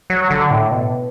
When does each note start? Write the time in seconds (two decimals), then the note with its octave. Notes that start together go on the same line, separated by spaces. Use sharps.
0.10 F#3
0.30 D3
0.51 A2
0.71 B2